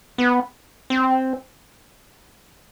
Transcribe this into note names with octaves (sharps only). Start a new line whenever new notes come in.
B3
C4